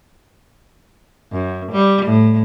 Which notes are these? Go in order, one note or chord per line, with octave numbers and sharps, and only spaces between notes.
F#2
G3
A2